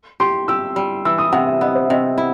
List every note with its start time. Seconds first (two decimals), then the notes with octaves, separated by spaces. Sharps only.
0.20 G4 C6
0.48 G4 E6
0.76 G3
1.05 E3 E6
1.18 D#6
1.33 C3 F#5
1.47 E5
1.61 B3 D#5
1.75 C5
1.86 E5
1.90 C3 D#5
2.18 E4